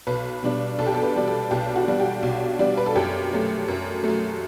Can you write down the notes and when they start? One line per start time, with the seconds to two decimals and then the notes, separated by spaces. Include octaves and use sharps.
0.07 B1 B4
0.43 B2 G3 D4
0.79 B1 A4
0.87 G4
0.94 A4
1.03 B4
1.15 B2 G3 D4
1.28 A4
1.51 B1 G4
1.76 F#4
1.87 B2 G3 D4
2.00 G4
2.23 B1
2.59 B2 G3 D4
2.77 B4
2.86 A4
2.96 F#2 G4
3.32 F#3 A3
3.68 F#2
4.04 F#3 A3